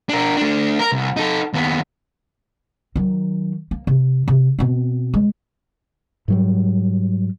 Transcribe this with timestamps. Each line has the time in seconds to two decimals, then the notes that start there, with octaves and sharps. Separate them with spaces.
0.09 D4 A#4
0.37 A3 D4
0.79 A#4
0.92 C2
1.17 D#4 A4
1.54 D#2 B3
2.96 D#3 F#3
3.71 A#3
3.87 C3
4.28 C3
4.59 B2 C4
5.14 G#3
6.28 G#2 F#3 G3